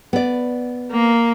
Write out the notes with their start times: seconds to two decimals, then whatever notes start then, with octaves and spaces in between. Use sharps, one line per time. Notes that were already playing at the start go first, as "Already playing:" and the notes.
0.13 B3 D5
0.91 A#3